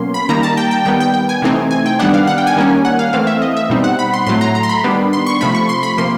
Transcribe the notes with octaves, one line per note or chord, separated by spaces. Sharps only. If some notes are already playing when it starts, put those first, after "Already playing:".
Already playing: B2 F#3 A#3 C#4 C6
B5
D#3 G3 A#3 A#5
A5
G5
G5
D#3 G3 B3 G5
G5
G5
G#5
C3 E3 A3 C4 D#4
G#5
G5
D#3 G3 B3 D4 F#5
F5
F#5
G5
G#5
D#3 G3 A#3 C#4
F#5
F5
E3 A3 C4 F5
E5
D#5
E5
B2 G3 C4 D#4
F#5
B5
C6
A2 F#3 A3 C6
A#5
A#5
C6
B5
D#3 G3 B3 D4
C6
C#6
C3 F3 A3 B5
C#6
C6
B5
C3 F3 A#3 C6